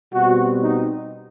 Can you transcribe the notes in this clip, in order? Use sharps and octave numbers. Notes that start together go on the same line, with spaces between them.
B2 G3 C4 F#4
D#4